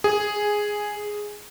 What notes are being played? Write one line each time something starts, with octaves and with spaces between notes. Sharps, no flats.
G#4